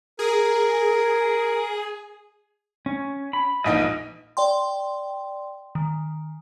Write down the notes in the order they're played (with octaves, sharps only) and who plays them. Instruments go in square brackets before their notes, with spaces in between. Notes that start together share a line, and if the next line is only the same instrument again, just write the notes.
[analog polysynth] G#4 [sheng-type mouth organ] A#4
[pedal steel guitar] C#4
B5
[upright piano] E1 A#1 D#4 [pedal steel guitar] D#5
[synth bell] D5 G5 C6
D#3